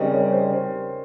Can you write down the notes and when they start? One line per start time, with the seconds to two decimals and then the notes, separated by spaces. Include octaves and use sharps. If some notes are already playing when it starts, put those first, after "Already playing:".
Already playing: C#3 G3 C4 D#4 A#4 C#5 D#5
0.12 C#5
0.32 C5